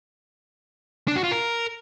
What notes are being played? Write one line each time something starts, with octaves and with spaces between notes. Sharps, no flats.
D4
F#4
F4
A#4